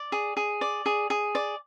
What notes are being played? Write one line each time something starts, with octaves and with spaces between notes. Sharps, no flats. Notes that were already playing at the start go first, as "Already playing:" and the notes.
Already playing: D5
G#4
G#4
D5
G#4
G#4
D5